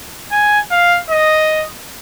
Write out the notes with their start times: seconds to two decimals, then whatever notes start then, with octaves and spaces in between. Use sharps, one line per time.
0.32 G#5
0.71 F5
1.10 D#5